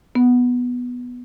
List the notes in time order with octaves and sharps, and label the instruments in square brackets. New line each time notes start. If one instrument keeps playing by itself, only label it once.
[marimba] B3